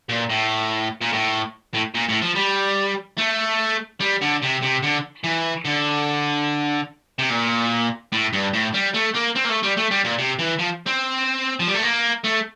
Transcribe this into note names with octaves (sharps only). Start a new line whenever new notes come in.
A#2
A2
A#2
A2
A2
A#2
A2
F3
G3
A3
G3
D3
C3
C3
D3
E3
D3
C3
A#2
A2
G2
A2
G3
A3
A#3
C4
A#3
A3
G3
A3
G3
A#2
C3
E3
F3
C4
F3
G3
A3
A#3
A3